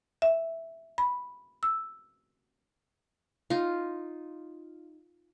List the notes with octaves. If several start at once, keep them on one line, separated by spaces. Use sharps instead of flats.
E5
B5
E6
D#4 F4